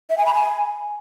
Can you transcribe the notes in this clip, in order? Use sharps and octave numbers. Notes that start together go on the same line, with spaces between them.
E5
G#5
B5
G#5